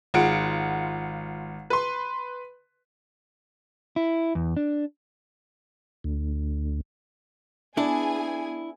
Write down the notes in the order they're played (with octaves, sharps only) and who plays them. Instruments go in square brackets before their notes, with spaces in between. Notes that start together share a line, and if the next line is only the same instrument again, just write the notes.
[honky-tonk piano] G#1 G#3 F4 F#5 D7
B4 C6
[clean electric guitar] E4
E2
D4
[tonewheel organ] D2
[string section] B3 G#4 G#5 [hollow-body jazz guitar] D4 E4